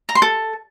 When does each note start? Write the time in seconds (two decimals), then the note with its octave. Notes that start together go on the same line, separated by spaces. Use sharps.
0.09 A#5
0.15 C6
0.22 A4